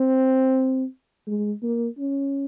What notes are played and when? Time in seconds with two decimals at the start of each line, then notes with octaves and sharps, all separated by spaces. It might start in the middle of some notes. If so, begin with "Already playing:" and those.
Already playing: C4
1.27 G#3
1.63 A#3
1.98 C#4